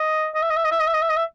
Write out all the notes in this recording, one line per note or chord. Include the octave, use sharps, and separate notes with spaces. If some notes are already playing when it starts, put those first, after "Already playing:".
Already playing: D#5
D#5
E5
D#5
E5
D#5
E5
D#5
E5
D#5
E5
D#5
E5